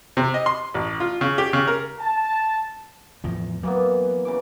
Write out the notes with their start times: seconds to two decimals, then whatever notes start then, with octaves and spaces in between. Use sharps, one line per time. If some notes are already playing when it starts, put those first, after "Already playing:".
0.17 C3
0.34 D#5
0.46 C6
0.74 A1
1.00 F4
1.21 C#3
1.38 G4
1.53 C#3
1.67 A#4
2.00 A5
3.24 E2 A2 F3
3.63 E3 F#3 A#3 B3
4.25 C#3 E3 D6